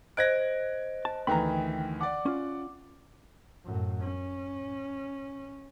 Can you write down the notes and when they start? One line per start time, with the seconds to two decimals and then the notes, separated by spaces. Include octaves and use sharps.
0.17 C5 D#5 F#6 G#6 A#6 D7
1.05 A5
1.27 D2 D#3 E3 G5 A#5 B5
2.01 D5 F#5 D6
2.26 C#4 F4
3.65 F#2 A2
4.02 C#4